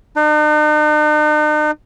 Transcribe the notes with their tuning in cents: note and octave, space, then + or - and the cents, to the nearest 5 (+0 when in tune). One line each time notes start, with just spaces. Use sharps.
D#4 -45